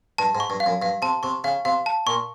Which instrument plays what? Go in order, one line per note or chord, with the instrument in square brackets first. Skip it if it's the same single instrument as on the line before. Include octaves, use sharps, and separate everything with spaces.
[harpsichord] G2 [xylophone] A5
[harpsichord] G#2
[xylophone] C#6
[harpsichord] G2
[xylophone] F5
[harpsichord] F#2
[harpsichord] G2 [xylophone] F5
[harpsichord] C3 [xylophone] A5
[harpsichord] C3 [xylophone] C#6
[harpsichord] C#3 [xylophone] F5
[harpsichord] C3 [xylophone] F5
[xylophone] A5
[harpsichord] A#2 [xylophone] C#6